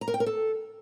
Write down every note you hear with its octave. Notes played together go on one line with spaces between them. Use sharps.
A#5
A#4
G5
A#4
A4